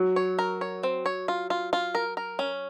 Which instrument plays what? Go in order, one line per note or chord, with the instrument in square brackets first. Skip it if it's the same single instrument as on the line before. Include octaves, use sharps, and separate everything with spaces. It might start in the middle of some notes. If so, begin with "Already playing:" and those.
Already playing: [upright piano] F#3
[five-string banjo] C#5
A#4
C#5
C4
C#5
F4
F4
F4
A#4
A#4
C#4